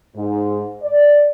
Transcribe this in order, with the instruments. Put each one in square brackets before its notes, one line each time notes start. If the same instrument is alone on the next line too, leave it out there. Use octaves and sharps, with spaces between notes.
[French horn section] G#2
D5